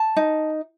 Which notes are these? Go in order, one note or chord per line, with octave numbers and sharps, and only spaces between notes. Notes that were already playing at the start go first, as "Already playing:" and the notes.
Already playing: A5
D#4